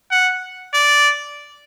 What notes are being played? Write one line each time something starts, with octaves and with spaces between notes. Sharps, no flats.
F#5
D5